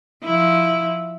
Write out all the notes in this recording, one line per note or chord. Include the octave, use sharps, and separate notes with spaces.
F3 E4